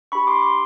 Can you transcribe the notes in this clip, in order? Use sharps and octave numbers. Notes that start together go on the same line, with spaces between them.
D4 G4 B5 C#6
C6 D6
C6 D6